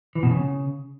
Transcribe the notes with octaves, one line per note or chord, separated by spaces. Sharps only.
E3
B2
C#3